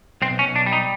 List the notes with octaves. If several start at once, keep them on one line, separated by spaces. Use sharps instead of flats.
B1 C4
C#4
B1
D4
G3
D#4